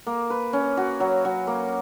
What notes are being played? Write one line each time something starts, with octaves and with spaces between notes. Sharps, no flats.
A#3
B4
C#4
F#4
F#3
F#3
A#3